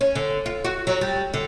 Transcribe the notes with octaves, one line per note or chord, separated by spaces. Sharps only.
C#4
D3
F4
F#4
F#3
G3
D3